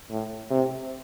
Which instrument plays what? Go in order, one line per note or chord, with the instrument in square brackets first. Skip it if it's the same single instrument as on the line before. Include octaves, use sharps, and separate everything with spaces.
[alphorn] A2
C3